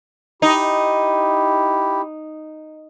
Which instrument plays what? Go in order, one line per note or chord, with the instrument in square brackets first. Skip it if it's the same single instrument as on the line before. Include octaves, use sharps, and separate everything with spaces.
[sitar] D#4 [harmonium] E4 G4